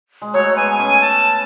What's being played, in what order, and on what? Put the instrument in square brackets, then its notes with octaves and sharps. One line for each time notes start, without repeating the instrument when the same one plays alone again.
[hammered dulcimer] G#3
[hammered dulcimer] F#3 A3 [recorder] C#5
[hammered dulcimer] G#3 B3 [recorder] G#5
[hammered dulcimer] A3 C#4 [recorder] G#5
[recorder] A5